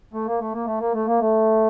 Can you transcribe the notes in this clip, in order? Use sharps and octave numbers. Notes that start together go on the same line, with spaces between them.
A3
A#3
A3
A#3
A3
A#3
A3
A#3
A3